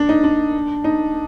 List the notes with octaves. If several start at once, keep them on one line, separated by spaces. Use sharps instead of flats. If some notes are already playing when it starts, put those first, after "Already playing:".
Already playing: D4
D#4
D4
D#4